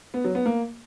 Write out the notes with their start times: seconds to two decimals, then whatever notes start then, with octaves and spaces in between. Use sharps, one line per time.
0.14 B3
0.24 F#3
0.35 B3
0.46 A#3